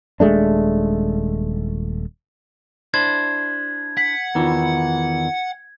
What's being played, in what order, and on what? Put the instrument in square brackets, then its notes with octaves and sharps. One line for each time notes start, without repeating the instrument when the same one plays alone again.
[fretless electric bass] D#1 G#3 A3 D4
[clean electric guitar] D4 E4 C5 [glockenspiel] G#6
[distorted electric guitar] F#5 [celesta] B6
[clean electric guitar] E2 D#3 E3 [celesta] D#4 F4